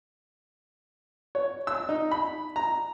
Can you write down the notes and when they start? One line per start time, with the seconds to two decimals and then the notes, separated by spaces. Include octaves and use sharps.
1.35 C#5
1.67 E6
1.89 D#4
2.11 B5
2.56 A#5